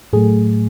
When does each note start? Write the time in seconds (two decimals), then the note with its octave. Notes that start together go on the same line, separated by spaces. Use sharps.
0.13 A2 F#3 A3 G#4